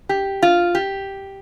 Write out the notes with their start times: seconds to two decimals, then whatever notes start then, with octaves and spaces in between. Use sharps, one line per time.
0.09 G4
0.43 F4
0.75 G4